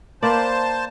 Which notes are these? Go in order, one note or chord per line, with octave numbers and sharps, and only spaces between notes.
A#3 B4 C5 D5 A5